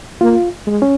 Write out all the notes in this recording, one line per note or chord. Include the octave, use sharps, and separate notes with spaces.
A#3 F4
G#3
C#4